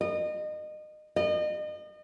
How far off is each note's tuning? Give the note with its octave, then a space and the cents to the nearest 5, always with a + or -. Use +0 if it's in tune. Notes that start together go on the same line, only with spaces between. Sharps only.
D#5 -30
D#5 -35